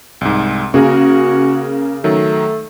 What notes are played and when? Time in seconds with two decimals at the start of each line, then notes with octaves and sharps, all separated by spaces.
0.21 C2 G#2
0.74 C#3 A#3 F#4 G#4 A#4
2.04 D#3 F#3 A3